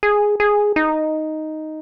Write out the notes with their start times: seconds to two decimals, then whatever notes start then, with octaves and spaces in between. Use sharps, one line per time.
0.03 G#4
0.40 G#4
0.76 D#4